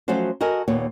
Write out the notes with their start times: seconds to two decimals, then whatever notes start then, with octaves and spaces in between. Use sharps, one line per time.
0.08 F3 F#3 A3 C#4 F#4 C5
0.41 F#4 A4 A#4 D#5 G#5
0.68 D#2 A#2 B3 C#5